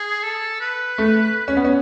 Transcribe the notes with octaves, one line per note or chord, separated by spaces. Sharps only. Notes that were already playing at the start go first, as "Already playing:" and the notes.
Already playing: G#4
A4
B4
A3
C#4
B3
C#4